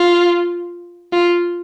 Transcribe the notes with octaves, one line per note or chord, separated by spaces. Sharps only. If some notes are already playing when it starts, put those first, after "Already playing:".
Already playing: F4
F4